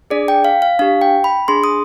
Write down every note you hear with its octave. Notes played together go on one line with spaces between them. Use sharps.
D4 G#4 D5
G5
F5
F5
D4 G4 F5
G5
B5
D4 G#4 C6
D#6